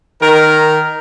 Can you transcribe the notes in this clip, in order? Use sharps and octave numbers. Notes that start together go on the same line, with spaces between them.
D#3 A#4